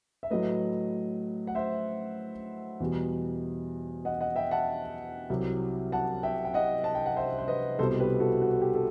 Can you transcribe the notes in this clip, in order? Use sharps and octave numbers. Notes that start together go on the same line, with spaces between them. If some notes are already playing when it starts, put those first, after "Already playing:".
E5
A2 F#3 A3 B4 D#5
F#5
C5 E5
E2 B2 G3
D#5 F#5
D#5 F#5
E5 G5
F#5 A5
C2 C3 F#3
F#5 A5
E5 G5
G5
D#5 F#5
A5
G5
F#5
C5 E5
C5
B4 D#5
C2 B2 G3 A4 C5
G4 B4
F#4 A4
F#4
G4
A4